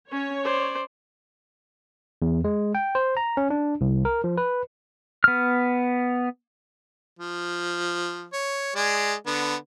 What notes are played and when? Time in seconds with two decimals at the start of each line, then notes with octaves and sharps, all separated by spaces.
0.11 C#4 C#5
0.44 C5 D5
2.22 E2
2.44 G#3
2.75 G5
2.95 C5
3.17 A#5
3.37 C#4
3.50 D4
3.81 C2
4.05 A#4
4.24 F3
4.38 B4
5.24 B3 F6
7.19 F3
8.33 C#5
8.76 G#3 G#4 D5
9.27 D3 B3